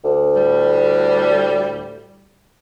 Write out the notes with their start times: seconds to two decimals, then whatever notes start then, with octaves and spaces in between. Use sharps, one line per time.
0.04 D2
0.34 A2 G3